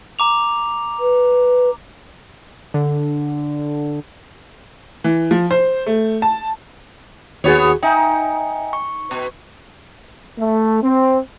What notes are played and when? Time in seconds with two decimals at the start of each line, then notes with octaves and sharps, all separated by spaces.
0.19 A#5 D6 F7
0.99 B4
2.74 D3
5.04 E3
5.31 F3
5.51 C5
5.86 A3
6.22 A5
7.44 D#2 B3 F#4 G#4 C#5
7.83 D#4 E5 G5 G#5
8.73 C#6
9.11 B2
10.39 A3
10.83 C4